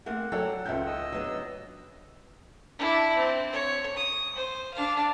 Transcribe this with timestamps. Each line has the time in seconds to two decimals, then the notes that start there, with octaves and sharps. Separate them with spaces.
0.06 A3 A#3 C4 F#5
0.32 F#3 A4 C#5 D5 G5
0.65 C#2 G#2 F4 E5 G6
0.86 D#5 E6
1.12 F#3 B3 D4
2.79 D4 E4
3.16 C4
3.53 C#5
3.97 D#6
4.36 C5
4.74 D4 F5